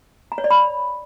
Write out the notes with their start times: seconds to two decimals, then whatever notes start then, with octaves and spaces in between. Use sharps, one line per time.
0.32 A#5
0.38 C#5
0.44 D5
0.50 B5